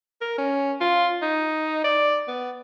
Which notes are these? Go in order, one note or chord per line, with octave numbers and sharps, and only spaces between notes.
A#4
C#4
F4
D#4
D5
B3